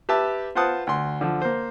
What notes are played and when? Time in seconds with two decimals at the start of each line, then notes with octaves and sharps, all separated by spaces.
0.09 G4 B4 E5 A5
0.55 F4 B4 C5 F#5 A5 D#6
0.87 D2 C6
1.21 D3 F3
1.42 A#3 C5